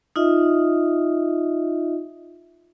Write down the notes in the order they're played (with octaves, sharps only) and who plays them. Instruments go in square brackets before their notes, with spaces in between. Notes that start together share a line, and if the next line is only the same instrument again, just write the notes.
[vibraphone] D#4 F4 D#5 E5